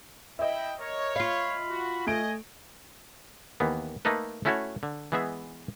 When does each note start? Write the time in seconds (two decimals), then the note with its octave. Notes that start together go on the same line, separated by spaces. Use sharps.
0.39 E4 D#5 E5 G5
0.80 A#4 C#5
1.16 F4 F5 B5
1.68 F#4
2.07 A3 D#5 G#5 D7
3.60 D#2 E3 A#3 B3
4.05 A3 A#3 D#4 A4 B4
4.45 A3 C#4 E4 F#4 A4 C#5
4.83 D3
5.12 E3 G#3 B3 G#4 E5